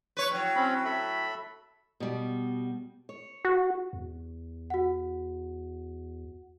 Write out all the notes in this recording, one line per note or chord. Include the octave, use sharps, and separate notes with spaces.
B4 C#5
A2 F#3
C4 C#4 B5
A4 E5 B5
B2 G3
C#5
F#4
E2
F#4 F#5